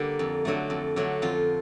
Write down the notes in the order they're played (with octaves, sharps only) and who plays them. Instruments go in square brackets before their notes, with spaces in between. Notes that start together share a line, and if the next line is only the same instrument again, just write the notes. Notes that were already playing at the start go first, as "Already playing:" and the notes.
Already playing: [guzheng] D3 G3 A#3
F2
D3 F#3 A3
F2
D3 F#3 A3
F2 F4